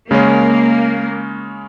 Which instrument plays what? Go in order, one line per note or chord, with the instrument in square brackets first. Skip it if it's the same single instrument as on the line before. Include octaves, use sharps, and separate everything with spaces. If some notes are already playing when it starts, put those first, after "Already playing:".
[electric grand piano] C#3 G#3 C#4 [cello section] A#3